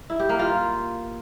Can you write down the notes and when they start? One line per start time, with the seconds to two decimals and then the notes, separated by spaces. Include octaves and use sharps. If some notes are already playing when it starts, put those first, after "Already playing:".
0.10 E4
0.19 G4
0.29 A#3
0.39 F4